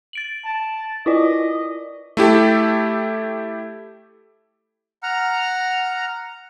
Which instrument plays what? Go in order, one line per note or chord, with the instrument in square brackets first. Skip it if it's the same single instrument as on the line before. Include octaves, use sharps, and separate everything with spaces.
[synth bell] A6 D7 F#7
[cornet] A5
[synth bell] E4 F4 D5 [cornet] D#5
[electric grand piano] A3 E4 G4 A4
[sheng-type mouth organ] F#5 A#5 F6